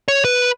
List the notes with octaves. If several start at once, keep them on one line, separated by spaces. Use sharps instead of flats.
C#5
B4